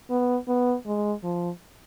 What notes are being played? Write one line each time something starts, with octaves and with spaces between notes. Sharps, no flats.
B3
B3
G#3
F3